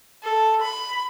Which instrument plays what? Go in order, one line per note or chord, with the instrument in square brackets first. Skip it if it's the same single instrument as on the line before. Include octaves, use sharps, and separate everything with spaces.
[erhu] A4
B5